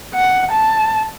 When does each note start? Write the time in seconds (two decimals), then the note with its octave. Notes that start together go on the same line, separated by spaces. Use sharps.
0.14 F#5
0.51 A5